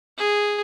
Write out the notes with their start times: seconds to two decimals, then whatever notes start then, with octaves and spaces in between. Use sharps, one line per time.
0.18 G#4